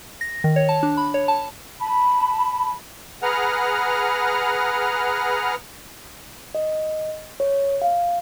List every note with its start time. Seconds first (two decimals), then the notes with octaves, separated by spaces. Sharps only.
0.21 A#6
0.44 D#3
0.56 C#5
0.69 A5
0.83 D4
0.97 B5
1.14 C#5
1.28 A5
1.80 A5 B5
3.23 G#4 B4 F#5 A#5 F6
6.55 D#5
7.40 C#5
7.82 F5